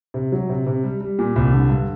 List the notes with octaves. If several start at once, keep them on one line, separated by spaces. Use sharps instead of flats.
C3
F#3
C3
C3
G3
G3
A#2
C2
D3
G2